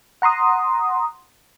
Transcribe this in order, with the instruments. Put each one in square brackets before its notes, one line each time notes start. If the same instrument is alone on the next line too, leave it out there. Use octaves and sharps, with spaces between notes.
[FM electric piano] F#5 A#5 C6 D#6